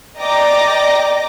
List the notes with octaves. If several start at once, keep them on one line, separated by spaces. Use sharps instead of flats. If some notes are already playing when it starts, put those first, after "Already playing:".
D5 D#5 G5 A#5 D6 A#6